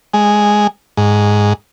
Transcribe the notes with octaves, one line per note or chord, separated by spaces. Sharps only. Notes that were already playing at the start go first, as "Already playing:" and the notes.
G#3
G#2